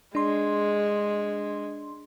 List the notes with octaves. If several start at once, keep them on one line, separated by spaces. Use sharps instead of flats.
G#3 D4 C6